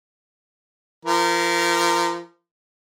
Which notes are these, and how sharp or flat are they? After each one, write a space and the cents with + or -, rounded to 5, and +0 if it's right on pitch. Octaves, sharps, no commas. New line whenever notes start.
F3 -30 A#4 -15